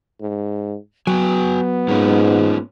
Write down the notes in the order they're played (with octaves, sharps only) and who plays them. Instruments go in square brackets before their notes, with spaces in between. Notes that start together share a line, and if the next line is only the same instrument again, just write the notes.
[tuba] G#2
[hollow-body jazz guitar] F#3 [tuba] B3 [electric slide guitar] F#4 G5 G#5
[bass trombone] G#2 [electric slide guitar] A#3 C#4 F4